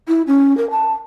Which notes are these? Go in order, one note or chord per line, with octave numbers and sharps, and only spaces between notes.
E4
C#4
A#4
A5